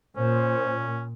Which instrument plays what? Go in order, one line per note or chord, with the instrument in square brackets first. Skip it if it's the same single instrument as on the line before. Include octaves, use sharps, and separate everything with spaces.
[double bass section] A#2 [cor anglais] C#4 [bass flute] C5